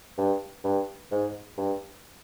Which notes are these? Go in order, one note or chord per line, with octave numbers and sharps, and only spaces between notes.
G2
G2
G#2
G2